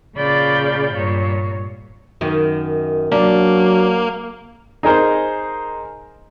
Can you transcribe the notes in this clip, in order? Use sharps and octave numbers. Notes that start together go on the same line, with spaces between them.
A#2 C#3 D5 F5 B5 G6
G2 A#2 C#5
F#2 D#3
F#3 A#3 D4
D#4 G#4 A#4 C5